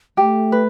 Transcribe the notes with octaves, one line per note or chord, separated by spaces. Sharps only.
A3 G4
B4